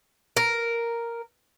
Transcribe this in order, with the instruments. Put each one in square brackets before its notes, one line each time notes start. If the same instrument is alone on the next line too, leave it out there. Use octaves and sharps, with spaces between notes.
[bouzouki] A#4